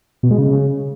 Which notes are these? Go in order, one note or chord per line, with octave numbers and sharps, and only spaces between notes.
B2
G#3
C#3